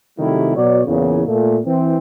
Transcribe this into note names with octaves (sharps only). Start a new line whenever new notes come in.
C3 D#3 F#3 G3 A3 E4
B2 F#3 F#4 C#5 D5
E2 A#2 C#3
A#2 A3
E3 C4